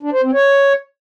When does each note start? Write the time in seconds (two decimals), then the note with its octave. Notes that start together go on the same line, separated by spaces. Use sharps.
0.03 D4
0.13 C5
0.23 C4
0.34 C#5